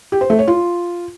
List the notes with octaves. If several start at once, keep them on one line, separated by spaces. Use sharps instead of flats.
G4
C5
A3
C#5
F4